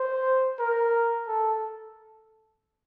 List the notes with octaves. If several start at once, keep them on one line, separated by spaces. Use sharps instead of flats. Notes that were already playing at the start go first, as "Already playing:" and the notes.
Already playing: C5
A#4
A4